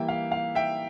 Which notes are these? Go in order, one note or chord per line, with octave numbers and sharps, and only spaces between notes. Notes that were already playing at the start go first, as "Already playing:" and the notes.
Already playing: E3 G3 A#3 E5 G5
F5
F5
E5 G5